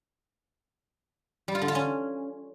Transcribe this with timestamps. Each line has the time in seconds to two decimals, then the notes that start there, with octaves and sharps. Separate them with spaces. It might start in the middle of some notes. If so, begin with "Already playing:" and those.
1.48 G3
1.55 F4
1.61 D3
1.68 F4
1.75 C#4